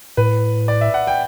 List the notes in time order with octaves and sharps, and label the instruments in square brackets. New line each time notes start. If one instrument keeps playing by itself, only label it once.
[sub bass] A2 [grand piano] B4
[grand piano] D5
E5
F#5
G5